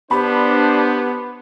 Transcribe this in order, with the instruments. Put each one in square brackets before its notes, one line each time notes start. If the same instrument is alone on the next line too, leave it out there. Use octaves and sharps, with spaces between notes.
[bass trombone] B3 [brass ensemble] D4 C5 [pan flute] G4 [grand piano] B5